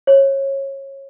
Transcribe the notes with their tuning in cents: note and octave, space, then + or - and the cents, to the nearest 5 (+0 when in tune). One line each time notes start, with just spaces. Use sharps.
C#5 -25